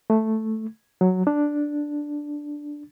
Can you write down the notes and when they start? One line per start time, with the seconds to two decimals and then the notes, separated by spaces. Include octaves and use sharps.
0.10 A3
1.01 F#3
1.27 D4